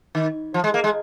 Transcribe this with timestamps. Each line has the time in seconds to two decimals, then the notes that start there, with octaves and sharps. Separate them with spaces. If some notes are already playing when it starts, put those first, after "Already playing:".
0.15 D#3
0.54 F3
0.64 G#3
0.74 A#3
0.84 G#3